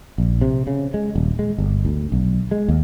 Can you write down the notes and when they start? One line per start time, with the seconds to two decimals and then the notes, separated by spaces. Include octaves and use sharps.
0.18 A#1
0.41 C3
0.67 C#3
0.94 G#3
1.15 D#1
1.39 G#3
1.58 G1
1.85 D2
2.12 B1
2.51 G#3
2.68 D#2